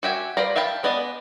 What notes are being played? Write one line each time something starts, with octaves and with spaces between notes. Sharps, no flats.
F#4 G4 E5 G#5
B4 C5 D5 F5 A#5
E5 F5 G5 A5 B5
G#3 B3 D5 D#5